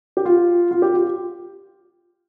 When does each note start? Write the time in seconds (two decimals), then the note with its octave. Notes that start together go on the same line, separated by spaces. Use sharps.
0.17 G4
0.25 F4
0.71 F4
0.82 G4
0.94 F4